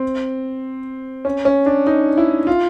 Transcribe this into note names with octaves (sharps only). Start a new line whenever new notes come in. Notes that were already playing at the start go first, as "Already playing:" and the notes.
Already playing: C4
C#4
C#4
D4
D#4
E4
F4